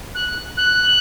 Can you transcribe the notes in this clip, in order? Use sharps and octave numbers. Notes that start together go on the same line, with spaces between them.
F#6
F#6